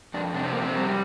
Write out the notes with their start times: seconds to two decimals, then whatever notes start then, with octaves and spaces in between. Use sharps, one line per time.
0.14 F2 D4
0.34 C3 D4
0.43 C4
0.53 F2 A#3
0.62 C4
0.76 G3